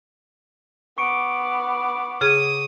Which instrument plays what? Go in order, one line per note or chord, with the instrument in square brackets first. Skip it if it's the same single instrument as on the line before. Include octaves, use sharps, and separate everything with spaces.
[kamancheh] B3 D6 [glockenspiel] C#6 C#7 D7
[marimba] C#3 G#4 G#6 [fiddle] D#6